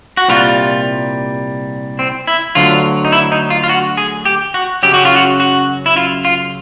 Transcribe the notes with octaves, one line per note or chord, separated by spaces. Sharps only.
F#4
C2 A#2 G3 F4
C4
E4
D2 D3 F#3 F4
D#4
E4
D#4
F4
F4
F#4
G#4
G4
F#4
F#2 C#3 F#3 G4
F#4
F4
F#4
F#4
E4
F4
F4